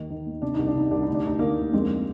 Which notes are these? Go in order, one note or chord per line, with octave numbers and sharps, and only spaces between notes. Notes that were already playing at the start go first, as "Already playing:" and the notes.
Already playing: D#2 D#3
D#3
D#2
C3 D4
C2 D#4
D4
C3 D#4
C2 D4
D#4
D2
D4
D2 D#4
D2 A#3 D4
D2
F2 G#3 C4